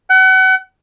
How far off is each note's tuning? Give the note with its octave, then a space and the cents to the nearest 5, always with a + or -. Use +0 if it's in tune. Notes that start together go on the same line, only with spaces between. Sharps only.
F#5 +35